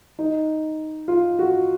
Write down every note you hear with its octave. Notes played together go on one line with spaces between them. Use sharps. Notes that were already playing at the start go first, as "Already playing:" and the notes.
D#4
F4
F#4